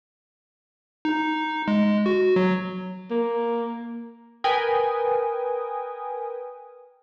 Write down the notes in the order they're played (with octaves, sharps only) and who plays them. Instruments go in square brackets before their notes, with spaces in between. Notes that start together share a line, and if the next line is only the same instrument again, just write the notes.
[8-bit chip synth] D#4
G#3
F#4
F#3
[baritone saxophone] A#3
[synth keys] A#4 B4 G5 G#5 D#6